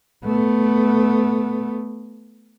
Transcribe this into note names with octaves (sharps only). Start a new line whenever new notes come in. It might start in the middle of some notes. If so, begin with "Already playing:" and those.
A3 B3